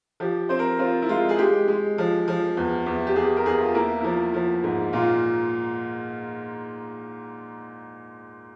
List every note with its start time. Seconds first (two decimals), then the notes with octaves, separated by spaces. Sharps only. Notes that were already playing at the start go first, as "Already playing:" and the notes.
0.20 F3 G4
0.49 C4 C5
0.59 A#4
0.79 C4 F4
1.02 E4
1.09 G#3 F4
1.29 G#4
1.38 G#3 G4
1.68 G#3
1.98 F3
2.28 F3
2.57 E2
2.86 E2
3.07 G4
3.15 E2 G#4
3.37 A#4
3.46 E2 G#4
3.60 F4
3.74 A#3 E4
4.01 F3 E4
4.34 F3
4.64 G#2
4.93 A#2 F4